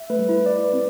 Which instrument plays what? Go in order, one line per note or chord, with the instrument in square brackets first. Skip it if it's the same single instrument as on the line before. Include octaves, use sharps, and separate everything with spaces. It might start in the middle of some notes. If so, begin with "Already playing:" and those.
Already playing: [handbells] E5
[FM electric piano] A3 [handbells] B4
[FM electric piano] G3
[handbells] E4
D5
B4
[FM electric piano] C4